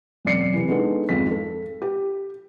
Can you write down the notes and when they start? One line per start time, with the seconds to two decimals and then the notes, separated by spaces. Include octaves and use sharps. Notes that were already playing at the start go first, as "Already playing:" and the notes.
0.25 E1 F#2 C4 D5 C7 C#7
0.54 C3 E3
0.68 G#3 B3 D4 D#4 A4
1.09 G#1 F2 G#3 B6
1.31 A4
1.82 G4